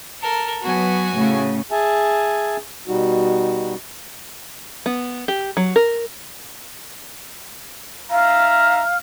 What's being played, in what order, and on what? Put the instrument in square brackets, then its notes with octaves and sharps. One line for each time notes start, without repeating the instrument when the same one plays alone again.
[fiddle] A4 A#4
[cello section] F#3 B3 [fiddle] F#4 G#5
[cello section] A2 C#3
[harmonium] G#4 E5 G#5 A5
B2 G3 D#4 F#4
[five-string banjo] B3
G4
F#3
A#4
[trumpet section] D#4 E5 A#5 [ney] F5 [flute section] F6